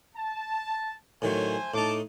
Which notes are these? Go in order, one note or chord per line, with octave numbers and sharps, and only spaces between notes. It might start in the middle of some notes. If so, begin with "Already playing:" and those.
A5
A2 D#3 F#3 A3 C5 G#5
A2 D#4 A5 D6